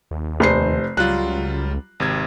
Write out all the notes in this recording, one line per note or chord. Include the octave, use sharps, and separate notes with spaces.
D#2
F1 C5 C7
C#2 F#3 G3 F4 F#6
G#1 C3 G#6